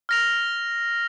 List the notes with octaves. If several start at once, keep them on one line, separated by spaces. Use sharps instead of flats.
F6 A#6 F7